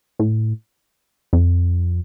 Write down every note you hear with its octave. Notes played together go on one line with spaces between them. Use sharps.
A2
F2